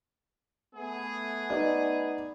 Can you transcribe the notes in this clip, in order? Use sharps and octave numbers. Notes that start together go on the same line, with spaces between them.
A3 B3 G#4
D#4 B4 D5